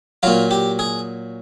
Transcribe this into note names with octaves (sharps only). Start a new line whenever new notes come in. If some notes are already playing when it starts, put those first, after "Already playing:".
A#2 F#3 F4
G4
G#4